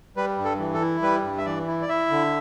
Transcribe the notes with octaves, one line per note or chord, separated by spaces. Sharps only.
G3 B4
G2
A4
E3
A4
E4
G3 B4
G2
E5
E3 D5
E4
D5
E4 E5
D3